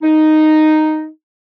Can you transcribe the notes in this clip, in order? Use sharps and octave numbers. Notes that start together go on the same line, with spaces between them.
D#4